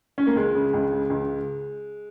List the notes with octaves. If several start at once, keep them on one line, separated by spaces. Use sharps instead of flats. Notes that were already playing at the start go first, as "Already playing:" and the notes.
C#4
A#3
C#2 G#3
C#3
C#2
C#3
C#2